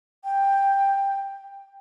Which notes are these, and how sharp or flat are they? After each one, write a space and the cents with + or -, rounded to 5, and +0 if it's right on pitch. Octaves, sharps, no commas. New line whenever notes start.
G5 +10